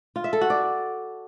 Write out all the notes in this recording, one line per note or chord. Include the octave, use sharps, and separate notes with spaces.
F4
E5
A4
F#4
D5